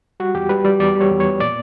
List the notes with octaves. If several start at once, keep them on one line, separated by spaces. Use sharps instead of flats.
G3 F#4
E2 G4
G3 B4
G3 D5
E2 D5
G3
C#5
E2
C#5
B3
A#2 D5